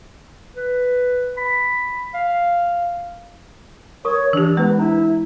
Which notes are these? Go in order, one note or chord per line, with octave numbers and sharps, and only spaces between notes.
B4
B5
F5
A#4 C#5 C#6 D#6
E3 D4 G4
G#3 B3 E4 B4
D4 E4 A#5